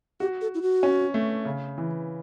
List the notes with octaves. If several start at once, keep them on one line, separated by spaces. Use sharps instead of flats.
F#4 G4
A4
E4
F#4
C#4
A3
C#3
E3